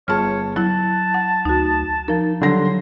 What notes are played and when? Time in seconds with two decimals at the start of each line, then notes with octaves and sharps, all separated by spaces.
0.08 G1 G#4 C#5 A5 F6
0.56 F#3 E4 A5 F#6
1.14 F#5
1.45 D2 D#4 F#4
2.08 F3 D#4 A#4
2.41 D3 F#3 G3 C6 A#6